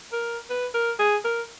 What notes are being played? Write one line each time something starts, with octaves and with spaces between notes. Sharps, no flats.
A#4
B4
A#4
G#4
A#4